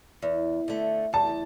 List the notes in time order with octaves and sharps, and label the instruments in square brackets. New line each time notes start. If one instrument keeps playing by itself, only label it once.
[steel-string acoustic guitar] E2
D3 A3
[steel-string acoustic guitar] E2 [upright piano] A5